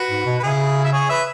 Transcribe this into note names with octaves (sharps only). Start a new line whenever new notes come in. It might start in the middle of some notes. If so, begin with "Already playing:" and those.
Already playing: F#4 B4
G#2
B2
B4
C#3 E4 G#4
E5
G#4 C#5
B4 E5